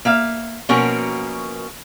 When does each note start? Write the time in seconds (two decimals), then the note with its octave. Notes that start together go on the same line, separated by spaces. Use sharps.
0.05 A#3 E5 F5
0.69 B2 F3 A#3 C#4 F#4 A#4